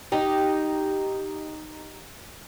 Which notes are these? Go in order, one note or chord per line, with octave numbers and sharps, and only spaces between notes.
D#4 G4